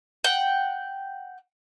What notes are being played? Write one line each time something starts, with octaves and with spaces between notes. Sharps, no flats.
F#5 G5